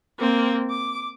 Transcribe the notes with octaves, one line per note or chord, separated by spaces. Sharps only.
A#3 C4
D6